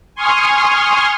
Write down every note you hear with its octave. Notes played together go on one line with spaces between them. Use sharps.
G#5 C6 C#6 D#6 F6